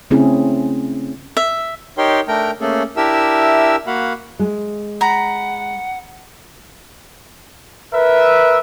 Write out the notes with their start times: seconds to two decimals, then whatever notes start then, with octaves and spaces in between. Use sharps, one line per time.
0.11 C#3 A3 C4 C#4 E4 G#4
1.37 E5
1.98 D#4 G4 A#4 C#5 G5 C6
2.28 A3 D4 A#4 G5 A#5
2.61 A3 A#3 C#4 G#4 A4
2.97 D4 E4 G4 A#4 E5 E6
3.87 A#3 F#4 F5 F#5 B5
4.39 G#3
5.01 F#5 A#5 B5
7.92 A#4 B4 E5